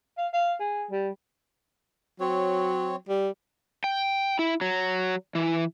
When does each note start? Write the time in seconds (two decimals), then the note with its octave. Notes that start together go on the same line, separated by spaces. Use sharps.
0.17 F5
0.33 F5
0.60 G#4
0.90 G3
2.20 F#3 C4 C#5
3.09 G3
3.84 G5
4.39 E4
4.61 F#3
5.35 E3